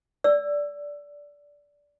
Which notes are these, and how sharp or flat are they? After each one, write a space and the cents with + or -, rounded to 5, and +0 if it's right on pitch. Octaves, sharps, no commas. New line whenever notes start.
D5 -15 E6 +20